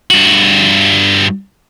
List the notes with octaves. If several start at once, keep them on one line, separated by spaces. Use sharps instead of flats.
G2 F#4